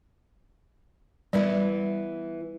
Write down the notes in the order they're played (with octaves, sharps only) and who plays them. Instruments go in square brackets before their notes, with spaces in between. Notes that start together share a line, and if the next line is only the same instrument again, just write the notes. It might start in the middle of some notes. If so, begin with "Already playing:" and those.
[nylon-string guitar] E3 B3 E4 [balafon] G3